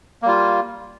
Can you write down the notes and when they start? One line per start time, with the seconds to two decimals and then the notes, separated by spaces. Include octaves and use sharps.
0.22 A#3
0.25 G3
0.28 F4